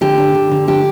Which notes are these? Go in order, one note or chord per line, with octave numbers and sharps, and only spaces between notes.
D3 G4
D4
D3
D3
D4 G4